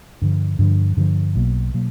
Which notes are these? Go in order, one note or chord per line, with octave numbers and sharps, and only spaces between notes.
G2 D3 F3
G2 D3 F3
G2 D3 F3
B1 B2 F#3 A#3
B2 F#3 A#3